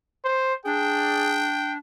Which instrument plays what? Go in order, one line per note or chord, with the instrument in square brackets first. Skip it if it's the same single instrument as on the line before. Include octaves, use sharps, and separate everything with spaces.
[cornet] C5
[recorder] D4 [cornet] G#4 [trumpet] G5